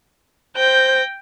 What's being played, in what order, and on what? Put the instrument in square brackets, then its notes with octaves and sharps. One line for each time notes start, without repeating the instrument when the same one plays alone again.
[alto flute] C5 [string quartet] G5 G6 A#6